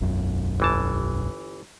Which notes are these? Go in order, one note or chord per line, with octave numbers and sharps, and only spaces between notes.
E1 B1 F#2
G1 E3 A5